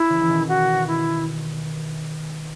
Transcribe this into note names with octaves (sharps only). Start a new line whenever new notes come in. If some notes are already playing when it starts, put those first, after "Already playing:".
Already playing: E4
C#3 E3
E3
B2 D#3
F#4
E4